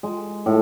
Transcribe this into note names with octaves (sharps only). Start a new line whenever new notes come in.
G#3
A2